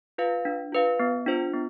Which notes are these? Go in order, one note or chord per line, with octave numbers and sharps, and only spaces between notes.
F4 B4 F5
D4
F4 B4 F5
B3
D4 F4 C5
B3